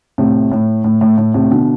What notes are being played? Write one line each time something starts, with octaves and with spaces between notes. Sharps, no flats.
A2 C3
A2
A2
A2
A2
A2 C3
B2 D3